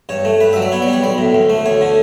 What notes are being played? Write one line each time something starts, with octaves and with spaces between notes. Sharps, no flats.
G2 C#5
A3
G2 B4
F#3 E5
D5
B3 C#5
D5
G3
C#5
B1 D5
A2
D2
A3
D2 C#5
D3